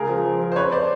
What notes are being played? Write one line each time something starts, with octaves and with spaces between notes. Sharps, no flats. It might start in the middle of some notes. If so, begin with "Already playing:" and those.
Already playing: C#2 G#4 A#4
F3
F3
F3
C5
F2 B4 C#5
C5 D5